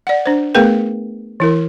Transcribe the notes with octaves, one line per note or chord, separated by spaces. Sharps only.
D5 F#5
D4 C5
A3 B3 G#4 A#4 B4 G5
E3 E4 A#4